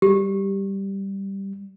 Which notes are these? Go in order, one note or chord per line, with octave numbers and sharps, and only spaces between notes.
G3 G4